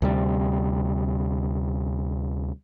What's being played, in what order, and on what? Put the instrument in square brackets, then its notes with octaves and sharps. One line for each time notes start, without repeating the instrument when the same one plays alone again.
[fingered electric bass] D2 C3 G3